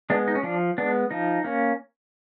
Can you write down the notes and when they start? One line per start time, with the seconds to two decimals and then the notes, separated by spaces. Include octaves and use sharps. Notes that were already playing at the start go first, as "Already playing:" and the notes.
0.10 G#3 B3 D4
0.28 D#4
0.35 C#4
0.43 F3 D4
0.78 G#3 B3 D4
1.11 F3 D#4
1.44 A#3 C#4